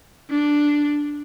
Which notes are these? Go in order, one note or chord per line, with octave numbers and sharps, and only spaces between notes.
D4